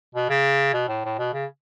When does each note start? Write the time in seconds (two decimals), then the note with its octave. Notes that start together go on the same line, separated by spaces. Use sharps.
0.15 B2
0.30 C#3
0.74 B2
0.89 A2
1.05 A2
1.19 B2
1.34 C#3